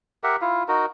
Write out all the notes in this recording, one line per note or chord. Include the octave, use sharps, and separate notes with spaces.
G4 A#4 E5 F#5
E4 F4 F5
D#4 F#4 A#4